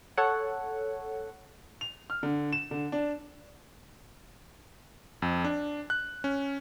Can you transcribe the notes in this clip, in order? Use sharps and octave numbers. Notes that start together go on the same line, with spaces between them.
A4 C#5 F#5
F7
F6
D3
E7
D3
D4
F2
D4
F#6
C#4